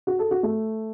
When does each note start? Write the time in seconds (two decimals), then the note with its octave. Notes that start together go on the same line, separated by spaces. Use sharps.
0.07 F#4
0.19 A4
0.31 F#4
0.43 A3